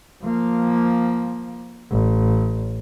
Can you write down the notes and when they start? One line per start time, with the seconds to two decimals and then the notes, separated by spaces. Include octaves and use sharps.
0.23 F3 A#3
1.91 A1